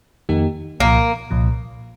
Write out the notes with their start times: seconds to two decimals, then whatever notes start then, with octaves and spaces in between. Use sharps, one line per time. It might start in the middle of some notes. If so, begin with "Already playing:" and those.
0.29 F2 D#3 A#3 D#4 G4
0.80 C2 A#2 F3 A#3
1.31 C2 A#2 F3